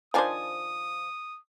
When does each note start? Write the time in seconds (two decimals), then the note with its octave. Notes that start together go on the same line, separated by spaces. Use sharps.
0.14 D#3 F3 D4 F4 C5 G#5 D#6